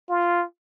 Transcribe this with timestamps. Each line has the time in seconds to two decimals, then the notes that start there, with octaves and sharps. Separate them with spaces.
0.09 F4